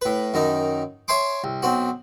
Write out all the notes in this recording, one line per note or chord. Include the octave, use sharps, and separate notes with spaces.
A2 B4
F#2 D#3 D#4
C#5 E5 G#5 C6 D6
C2
B1 C4 F#4